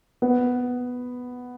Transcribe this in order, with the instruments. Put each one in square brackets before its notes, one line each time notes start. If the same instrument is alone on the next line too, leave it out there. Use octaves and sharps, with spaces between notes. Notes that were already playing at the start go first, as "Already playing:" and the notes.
[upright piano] B3